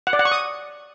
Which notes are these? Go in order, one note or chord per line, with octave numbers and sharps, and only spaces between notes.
F#5
D5
F#5
C#6
D#6